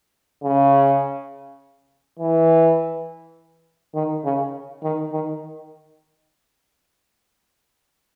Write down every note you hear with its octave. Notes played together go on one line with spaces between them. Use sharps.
C#3
E3
D#3
C#3
D#3
D#3